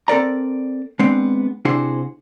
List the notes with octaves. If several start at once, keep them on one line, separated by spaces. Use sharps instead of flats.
C4 A4 A#4 D5 A#5
G#3 B3 C4 D4
C3 D4 E4 F#4 G#4 C5